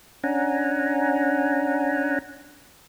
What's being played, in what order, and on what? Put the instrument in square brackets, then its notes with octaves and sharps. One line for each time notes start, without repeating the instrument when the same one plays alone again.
[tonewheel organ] C#4 D4 F#5 G#5 A#5